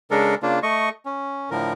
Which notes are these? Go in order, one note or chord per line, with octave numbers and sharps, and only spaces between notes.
C#3 G#3 D4 A4 A#4
C#3 A#3 D4 F4
A3 D#5 C#6
C#4
A2 D3 F3 A#4